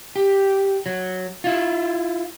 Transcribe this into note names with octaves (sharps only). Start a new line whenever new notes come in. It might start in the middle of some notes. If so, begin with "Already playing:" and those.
G4
F#3
E4 F4